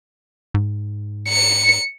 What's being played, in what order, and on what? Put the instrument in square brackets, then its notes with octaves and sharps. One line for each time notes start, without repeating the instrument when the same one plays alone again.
[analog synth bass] G#2
[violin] C#7